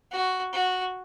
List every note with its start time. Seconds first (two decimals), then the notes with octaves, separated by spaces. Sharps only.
0.11 F#4
0.53 F#4